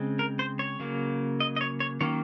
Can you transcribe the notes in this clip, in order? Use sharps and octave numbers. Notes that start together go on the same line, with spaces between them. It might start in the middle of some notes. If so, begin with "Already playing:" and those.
Already playing: C#3 G#3 C4
A#4
C5
C#5
C#3 F#3 A#3
D#5
D#5
C#5
C#5
D#3 F#3 A#3 C#4 C#5